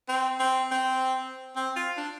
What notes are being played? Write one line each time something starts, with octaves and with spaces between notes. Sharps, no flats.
C4
C4
C4
C4
F4
D4